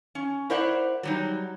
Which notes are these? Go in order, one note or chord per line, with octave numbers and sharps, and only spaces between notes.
C#4
E4 A#4 C5 D5 E5 F#5
F#3 G3 D#4